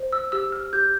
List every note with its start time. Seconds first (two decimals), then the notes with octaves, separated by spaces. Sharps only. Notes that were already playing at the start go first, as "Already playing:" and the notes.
Already playing: C5
0.12 E6
0.32 G4 E6
0.52 F6
0.73 G4 G6